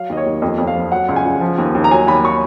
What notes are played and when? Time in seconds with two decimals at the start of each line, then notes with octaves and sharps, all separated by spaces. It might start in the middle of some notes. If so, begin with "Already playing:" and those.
Already playing: F#3 F5
0.09 D#2 D#5
0.17 C#5
0.26 D#2
0.42 F2 D#5
0.58 F2
0.67 F5
0.75 F3
0.92 F#3 F#5
1.08 C#2
1.16 G#5
1.25 C#2
1.41 F3
1.58 D#2
1.75 D#2
1.84 A#5
1.91 F#3 G#5
2.07 D#2 B5
2.25 C#6